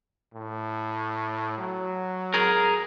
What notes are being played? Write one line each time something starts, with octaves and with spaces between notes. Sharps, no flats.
A2
F#3
G#4 A#4